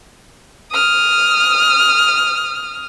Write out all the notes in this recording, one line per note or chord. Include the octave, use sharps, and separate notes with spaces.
D#6 F6